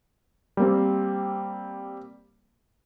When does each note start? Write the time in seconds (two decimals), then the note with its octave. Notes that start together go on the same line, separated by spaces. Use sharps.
0.57 G3 A#3 C4